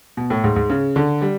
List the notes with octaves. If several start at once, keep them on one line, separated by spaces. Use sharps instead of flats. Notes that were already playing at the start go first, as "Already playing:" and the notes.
B2
A2
G#2
G#2
C#3
D3
G3